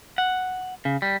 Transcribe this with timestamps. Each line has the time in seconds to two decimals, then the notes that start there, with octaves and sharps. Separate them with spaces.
0.18 F#5
0.85 C#3
1.02 G3